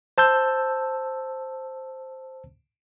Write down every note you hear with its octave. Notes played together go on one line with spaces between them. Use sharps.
C5 A5 E6 G6